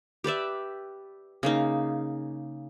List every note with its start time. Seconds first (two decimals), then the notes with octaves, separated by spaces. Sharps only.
0.24 G4 B4 D5 E5
1.43 C#3 A#3 D#4